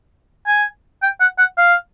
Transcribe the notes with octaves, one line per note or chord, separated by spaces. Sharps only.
G#5
G5
F#5
F#5
F5